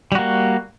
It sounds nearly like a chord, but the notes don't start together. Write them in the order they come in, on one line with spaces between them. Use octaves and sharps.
G3 F#4 A#3